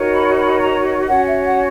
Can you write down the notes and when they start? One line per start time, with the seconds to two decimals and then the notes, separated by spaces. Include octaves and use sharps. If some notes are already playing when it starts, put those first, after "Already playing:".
Already playing: D#4 F#4 A#4 C#5
0.14 B5
0.38 B5
0.61 A#5
1.09 C#4 F#4 C#5 F#5
1.27 E5
1.45 F#5